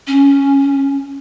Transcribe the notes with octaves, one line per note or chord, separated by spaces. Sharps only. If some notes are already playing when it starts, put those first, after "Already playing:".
C#4